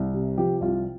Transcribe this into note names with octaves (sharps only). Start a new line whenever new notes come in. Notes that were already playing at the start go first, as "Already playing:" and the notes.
Already playing: C2
C3
F3 G4
C2 F4